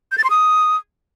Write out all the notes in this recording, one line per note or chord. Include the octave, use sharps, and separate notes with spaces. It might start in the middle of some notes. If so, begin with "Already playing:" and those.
G6
A6
C6
D#6